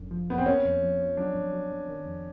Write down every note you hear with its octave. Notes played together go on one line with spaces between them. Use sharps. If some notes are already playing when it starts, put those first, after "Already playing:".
Already playing: G1 F#2 D3
F3
F#2 B3
C4
A#3 C#4
F2
F3
F3
F#3 D4
G2
F#3
G2
D#3
F2